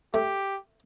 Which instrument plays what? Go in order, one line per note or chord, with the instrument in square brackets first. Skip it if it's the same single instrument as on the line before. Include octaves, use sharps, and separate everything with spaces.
[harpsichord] A3 [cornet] G4